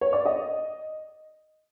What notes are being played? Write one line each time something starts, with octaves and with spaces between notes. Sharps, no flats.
C#5
D5
D#5